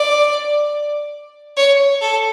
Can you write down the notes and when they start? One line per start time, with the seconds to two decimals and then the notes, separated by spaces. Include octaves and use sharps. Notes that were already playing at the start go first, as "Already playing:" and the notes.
Already playing: D5
1.57 C#5
2.01 A4